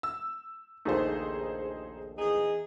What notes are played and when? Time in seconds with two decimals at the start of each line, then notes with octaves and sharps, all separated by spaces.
0.03 E6
0.85 A#1 D#2 A3 D#4 G#4 C5
2.17 E2 D#4 G#4